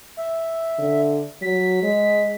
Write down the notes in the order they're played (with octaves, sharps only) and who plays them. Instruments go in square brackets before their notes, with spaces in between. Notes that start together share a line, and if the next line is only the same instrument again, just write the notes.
[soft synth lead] E5
[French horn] D3
[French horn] F#3 [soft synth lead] B6
[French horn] G#3